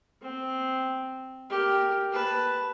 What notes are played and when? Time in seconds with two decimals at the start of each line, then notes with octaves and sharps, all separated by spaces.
0.22 C4
1.49 G4 A#4
2.12 B4 A5